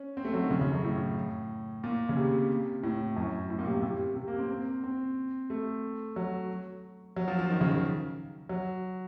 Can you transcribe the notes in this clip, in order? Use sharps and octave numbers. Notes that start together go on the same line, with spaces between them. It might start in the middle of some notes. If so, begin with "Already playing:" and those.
Already playing: C#4
C4
A3
F#3
D#3
C#3
C#3
F#2
A2
A#2
C#3
C3
A2
F#2
A2
A#2
C3
A#2
C3
C3
A#3
C4
C4
C4
A3
F#3
F#3
F3
F3
D#3
C#3
C#3
F#3